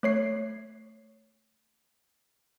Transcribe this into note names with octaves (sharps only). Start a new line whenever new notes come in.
A3 C#5 C7